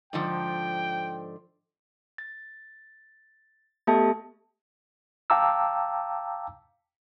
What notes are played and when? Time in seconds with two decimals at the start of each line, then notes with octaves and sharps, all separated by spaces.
0.13 G#2 D3 F3 G5
2.18 A6
3.87 A3 B3 G4 A4 E5 A5
5.30 F5 G5 A5 A#5 D6 E6